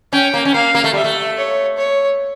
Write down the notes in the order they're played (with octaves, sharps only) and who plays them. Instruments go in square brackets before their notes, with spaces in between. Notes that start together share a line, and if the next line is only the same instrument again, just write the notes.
[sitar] C#4 [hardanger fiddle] G5
[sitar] A#3
C#4
[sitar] A#3 [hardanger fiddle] F5
[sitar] A#3
A3
[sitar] G3 [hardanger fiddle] E5
[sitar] A3
[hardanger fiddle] C#5
C#5